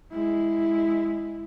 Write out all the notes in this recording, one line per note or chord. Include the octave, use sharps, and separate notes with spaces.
G#3 E4